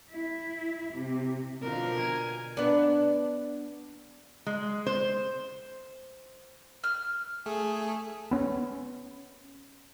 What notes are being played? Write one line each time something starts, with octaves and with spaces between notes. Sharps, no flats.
E4
C3
B2 D3 F3 A#4
G#5
B3 D4
G#3
C5
F6
A3 G#4
B3 C#4